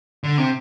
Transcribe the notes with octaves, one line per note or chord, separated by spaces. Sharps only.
D3
C3